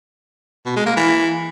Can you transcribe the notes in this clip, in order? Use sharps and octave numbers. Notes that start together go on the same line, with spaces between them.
B2
G#3
A#3
E3